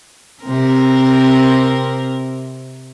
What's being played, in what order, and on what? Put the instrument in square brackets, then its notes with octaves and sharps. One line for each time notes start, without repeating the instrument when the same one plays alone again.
[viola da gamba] C3 C4 A#4